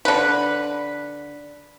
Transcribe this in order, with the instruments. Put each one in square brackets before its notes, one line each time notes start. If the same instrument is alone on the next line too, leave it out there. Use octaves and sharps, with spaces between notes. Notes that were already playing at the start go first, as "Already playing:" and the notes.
[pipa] D3 B4